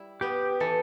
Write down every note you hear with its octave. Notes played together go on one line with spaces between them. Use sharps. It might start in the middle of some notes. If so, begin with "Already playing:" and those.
Already playing: G3 E4
B3 G4
E3 A4